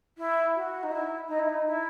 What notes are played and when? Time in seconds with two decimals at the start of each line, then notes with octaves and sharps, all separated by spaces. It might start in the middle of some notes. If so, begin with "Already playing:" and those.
0.17 E4
0.55 F#4
0.83 D#4
0.91 E4
1.27 D#4
1.39 E4
1.49 D#4
1.66 E4